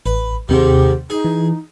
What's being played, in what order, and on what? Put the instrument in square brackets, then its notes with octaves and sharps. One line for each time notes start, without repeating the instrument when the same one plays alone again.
[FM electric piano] A1 [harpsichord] B4
[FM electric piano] D#2 C3 [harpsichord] G#2 D#3 [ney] G4
[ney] D#4 [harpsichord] G#4
[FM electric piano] E3